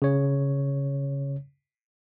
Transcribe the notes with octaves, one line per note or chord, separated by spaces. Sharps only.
C#3 C#5